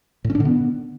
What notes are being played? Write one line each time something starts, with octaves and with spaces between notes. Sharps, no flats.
A2
C#4
D4
D3
B3